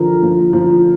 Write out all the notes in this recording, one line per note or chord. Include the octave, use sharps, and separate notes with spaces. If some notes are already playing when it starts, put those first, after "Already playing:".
Already playing: D3 F3 A#4
F3
F3